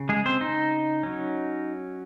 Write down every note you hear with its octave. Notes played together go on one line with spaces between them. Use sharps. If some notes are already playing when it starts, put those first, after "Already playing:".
Already playing: C#3
G#3 G#4
C4 C5
D#4
F#3 C#4